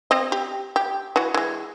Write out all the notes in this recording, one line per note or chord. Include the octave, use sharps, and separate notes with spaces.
C4 D#5
G4
G4
E3 F#4
E3 G#3